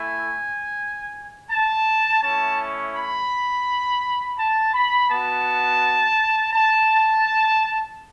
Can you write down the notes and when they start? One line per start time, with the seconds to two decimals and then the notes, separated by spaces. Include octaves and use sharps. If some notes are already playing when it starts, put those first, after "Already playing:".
Already playing: A3 E4 G#5
1.50 A5
2.22 A3 C#4 E4 A5
2.94 B5
4.38 A5
4.73 B5
5.09 B3 F#4 A5
6.53 A5